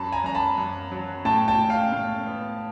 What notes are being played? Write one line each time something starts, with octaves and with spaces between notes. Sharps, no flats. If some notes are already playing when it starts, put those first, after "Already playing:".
Already playing: F#2 A5 B5
G#5 A#5
F#2 A#5
A5 B5
F#2
F#3
A2 G5 A5
G5 A5
A2
F5 G5
A2
B3